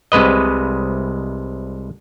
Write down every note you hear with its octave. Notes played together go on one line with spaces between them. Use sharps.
C2 C3 G#3 B4 D#5